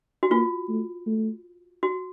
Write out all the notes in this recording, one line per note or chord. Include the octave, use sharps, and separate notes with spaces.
F#4
A#3 F4
A3
A3
F#4